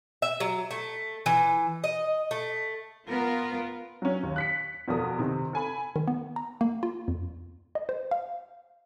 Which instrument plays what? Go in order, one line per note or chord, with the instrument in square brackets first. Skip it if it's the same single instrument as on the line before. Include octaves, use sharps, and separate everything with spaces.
[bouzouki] E5
F#3
A3
E3
D#5
A3
[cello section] B3 F4 A#4
[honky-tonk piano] F#3 C#4
D#2
F#6 B6 C#7
A#1 E2 B2 A4 A#4 D#6
C3 D#3
A4 G#5 B5
[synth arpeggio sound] D#3
B3
A#5
A#3
F4
F2
D#5
C5
F5